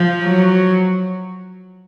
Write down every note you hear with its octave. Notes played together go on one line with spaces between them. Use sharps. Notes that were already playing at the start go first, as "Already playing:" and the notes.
Already playing: F3
F#3